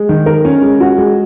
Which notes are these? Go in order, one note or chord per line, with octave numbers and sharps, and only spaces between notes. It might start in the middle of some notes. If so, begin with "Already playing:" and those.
Already playing: G#3
D#3
A#4
C#4
G#3
F#4
G#3